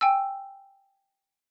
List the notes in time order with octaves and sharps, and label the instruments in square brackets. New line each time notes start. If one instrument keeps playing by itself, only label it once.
[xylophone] G5 G#5 E6